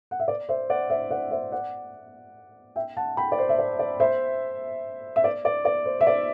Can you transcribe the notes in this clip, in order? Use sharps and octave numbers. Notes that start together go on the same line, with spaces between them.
F#5
E5
D5
C5 E5
D5 F#5
C5 E5
D5 F#5
C5 E5
D5 F#5
E5 G5
F#5 A5
G5 B5
D5
C5
E5
D5
D5
C5 E5
E5
D5
D5
D5
C5
E5
D5